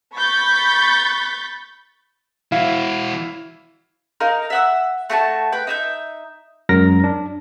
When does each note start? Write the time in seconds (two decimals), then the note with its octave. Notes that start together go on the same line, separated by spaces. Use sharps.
0.18 B5 C#6 G6 A6 B6
2.52 E3 E4 F#4 F5
4.21 D#4 A#4 F5
4.50 E5 F#5 E6
5.10 A3 F#4 G5 A5
5.53 B4 G5
5.67 D#4 E5 G6
6.69 F#2 F#3 G#3 A#4 A#6
7.04 D4